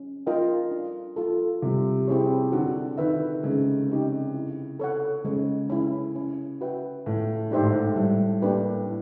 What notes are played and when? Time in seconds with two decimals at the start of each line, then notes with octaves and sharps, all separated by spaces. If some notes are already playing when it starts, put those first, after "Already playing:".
Already playing: C#4
0.26 F4 A#4 D#5 G5
0.71 D4
1.16 F4 A4
1.62 C3 G3
2.08 C4 E4 G#4 C#5
2.52 D3 F#4
2.98 D#3 B4 E5
3.43 C#3 G#3
3.88 C4 D#4 G4
4.34 E4
4.79 A4 C#5 F#5
5.24 C#3 G#3
5.70 C#4 E4
6.15 C#4
6.61 F#4 B4 E5 G5
7.06 A2 A3
7.51 G#2 D4 G4 C5 E5
7.62 A2
7.72 G#2
7.96 A2 G3
8.42 A#3 D4 G4 B4
8.87 E4